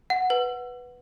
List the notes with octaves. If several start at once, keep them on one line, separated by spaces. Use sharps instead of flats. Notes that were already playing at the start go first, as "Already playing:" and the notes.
F#5
B4